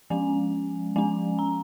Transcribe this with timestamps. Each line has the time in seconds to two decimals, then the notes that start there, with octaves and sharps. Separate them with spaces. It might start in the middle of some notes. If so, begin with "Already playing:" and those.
0.10 F3 G#3 C#4 G#5
0.96 F3 G#3 C#4 G#5
1.39 A#5